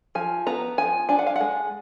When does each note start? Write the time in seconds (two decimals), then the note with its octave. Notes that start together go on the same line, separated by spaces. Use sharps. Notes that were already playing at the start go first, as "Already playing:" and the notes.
0.15 F3 G#5
0.46 B3 A#5
0.78 F3 G#5
1.09 D4 G#5
1.19 F#5
1.26 F5
1.36 G#3 F#5